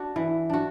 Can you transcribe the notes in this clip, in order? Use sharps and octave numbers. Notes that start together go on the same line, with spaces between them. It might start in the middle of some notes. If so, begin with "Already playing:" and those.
Already playing: D4 F#4
E3
D4 F#4